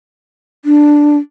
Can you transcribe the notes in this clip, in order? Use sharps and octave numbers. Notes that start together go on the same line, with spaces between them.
D4